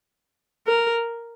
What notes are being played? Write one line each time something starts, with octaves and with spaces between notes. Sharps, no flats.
A#4